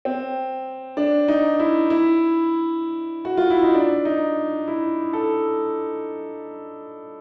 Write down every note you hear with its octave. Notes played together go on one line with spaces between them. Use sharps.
C4
D4
D#4
E4
E4
F#4
F4
E4
D#4
D4
D#4
E4
A4